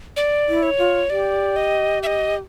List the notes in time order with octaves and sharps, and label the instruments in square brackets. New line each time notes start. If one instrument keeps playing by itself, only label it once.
[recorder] D5
[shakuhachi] E4
[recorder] C#5
[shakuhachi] F4
[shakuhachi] G4 [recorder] D5
[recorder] D#5
E5
D#5